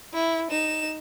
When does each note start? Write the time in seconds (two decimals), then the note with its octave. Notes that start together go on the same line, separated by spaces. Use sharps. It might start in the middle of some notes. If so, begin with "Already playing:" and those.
0.14 E4
0.50 D#4 E7